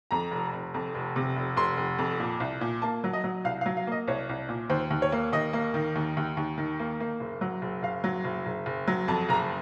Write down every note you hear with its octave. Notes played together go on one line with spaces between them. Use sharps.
F2 A#5
F1
F1
F2
F1
C3
F1
F1 C6
F1
F2
A#2
C2
A#2
A#3 A5
F#3
D#5
F#3
C2 F5
F5
F#3
F5
A#3 D#5
C2 C#5
C2
A#2
D#2 C5
D#2
C#5
A#3
D#2 D#5
A#3
D#3
D#2
D#2
D#2
D#3
A#3
A#3
F#1
F#3
F#1
F#1 F5
F#3
F#1
F#1
F#1
F#3
F2 A5
F#1 A#5